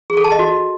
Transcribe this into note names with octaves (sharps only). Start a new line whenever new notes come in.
G#4
A4
A5
D#5
F#4